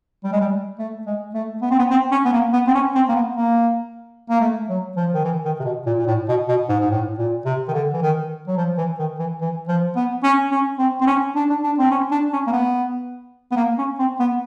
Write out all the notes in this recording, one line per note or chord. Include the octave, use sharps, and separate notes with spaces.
G3
G#3
G3
A3
G#3
A3
B3
C4
B3
C4
C#4
B3
A#3
B3
C4
C#4
C4
A#3
B3
A#3
A#3
A3
F#3
F3
D#3
E3
D#3
C3
B2
A#2
A#2
A2
B2
B2
G#2
G#2
A2
A#2
C3
D#3
D3
E3
D#3
F#3
F3
E3
D#3
E3
E3
F3
B3
C#4
C#4
C4
C4
C#4
D4
D4
D4
C4
C#4
D4
C#4
A#3
B3
B3
A#3
C#4
C4
B3